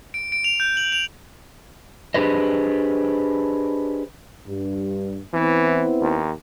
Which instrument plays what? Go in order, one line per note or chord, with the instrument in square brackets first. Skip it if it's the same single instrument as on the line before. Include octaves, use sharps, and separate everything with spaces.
[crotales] D7
D7
F7
G6
F#7
F7
[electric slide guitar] D4 G4 G#4 B4 C5 D#5
[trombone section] G2
[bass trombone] E3 [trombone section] B3 C4 E4
[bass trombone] D#2